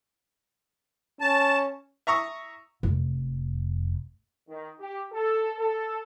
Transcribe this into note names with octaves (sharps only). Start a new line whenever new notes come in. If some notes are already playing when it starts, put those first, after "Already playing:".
C#4 A5
E5 A#5 C#6 D#6
F1
D#3
G4
A4
A4